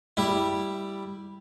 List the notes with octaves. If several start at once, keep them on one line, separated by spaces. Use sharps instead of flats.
G3 E4